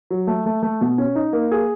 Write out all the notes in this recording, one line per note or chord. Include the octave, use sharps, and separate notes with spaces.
F#3
A3
A3
A3
B2
C#4
D#4
A#3
G#4